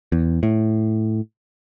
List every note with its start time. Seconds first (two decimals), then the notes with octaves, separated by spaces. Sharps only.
0.12 E2
0.43 A2